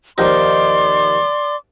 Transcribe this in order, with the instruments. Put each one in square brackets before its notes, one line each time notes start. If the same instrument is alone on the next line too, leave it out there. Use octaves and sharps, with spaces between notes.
[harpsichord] D#2 F3 D#4 [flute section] D5 C6 D6